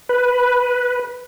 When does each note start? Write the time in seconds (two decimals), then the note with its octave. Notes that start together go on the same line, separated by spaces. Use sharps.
0.09 B4